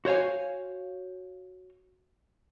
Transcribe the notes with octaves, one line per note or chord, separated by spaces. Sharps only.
F#4 C5 C#5 F5 G#5